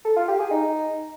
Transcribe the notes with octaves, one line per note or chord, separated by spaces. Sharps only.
A4
F4
G4
G#4
D#4